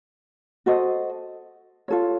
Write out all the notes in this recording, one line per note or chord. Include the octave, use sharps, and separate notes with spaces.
F#4 A4 C5 D#5
F4 A4 C#5